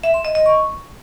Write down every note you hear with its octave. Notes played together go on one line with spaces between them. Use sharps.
E5
C6
D#5
D#5
C#6